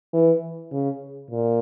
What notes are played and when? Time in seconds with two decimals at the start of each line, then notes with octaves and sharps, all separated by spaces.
0.13 E3
0.72 C#3
1.31 A#2